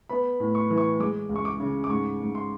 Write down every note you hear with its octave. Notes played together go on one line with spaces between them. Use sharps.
B3 B5
A2
C#6
E3
C#6
G#3 D6
C#2
C#6
D6
C#3
D6
G#2 C#6
G#2
C6